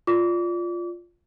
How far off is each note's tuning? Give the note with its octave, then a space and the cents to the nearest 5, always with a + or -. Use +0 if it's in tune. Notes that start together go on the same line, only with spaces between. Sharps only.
F4 +0 D5 +0 D6 -35